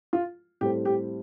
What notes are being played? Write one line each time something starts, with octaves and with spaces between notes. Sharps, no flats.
F4
A2 G3 C4 G4
G4